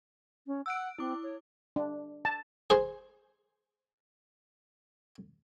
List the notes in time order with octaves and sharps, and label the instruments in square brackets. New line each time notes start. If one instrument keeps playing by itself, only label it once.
[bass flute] C#4
[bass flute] F#5 [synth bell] E6 F#6 D7
[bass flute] C4 [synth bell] E4 D6
[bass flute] C#5
[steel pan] D4
A5
[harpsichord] G#4 C5